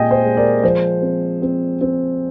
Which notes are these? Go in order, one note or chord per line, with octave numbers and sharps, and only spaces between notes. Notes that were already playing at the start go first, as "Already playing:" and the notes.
Already playing: A#2 G#3 C4 D#5 G5 G#5
C5
G#3
A#4 D5
F3 C5
C4
C4
C4